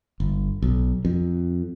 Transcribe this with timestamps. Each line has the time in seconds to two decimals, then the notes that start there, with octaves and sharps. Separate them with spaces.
0.20 G1
0.62 B1
1.05 F2